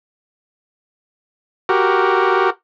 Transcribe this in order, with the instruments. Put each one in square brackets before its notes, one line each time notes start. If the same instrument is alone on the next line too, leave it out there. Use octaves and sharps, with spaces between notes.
[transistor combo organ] F#4 G4 A#4